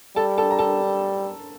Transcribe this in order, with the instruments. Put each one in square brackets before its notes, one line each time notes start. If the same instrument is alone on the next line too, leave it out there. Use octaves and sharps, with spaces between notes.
[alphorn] G3 [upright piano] A4 A5
[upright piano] A4 A5
A#5
A4 A5